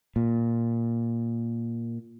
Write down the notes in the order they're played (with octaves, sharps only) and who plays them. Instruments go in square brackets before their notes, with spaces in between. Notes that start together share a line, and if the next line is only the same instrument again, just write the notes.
[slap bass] A#2